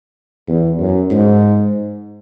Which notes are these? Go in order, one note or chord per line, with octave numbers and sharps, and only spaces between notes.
E2
F#2
G#2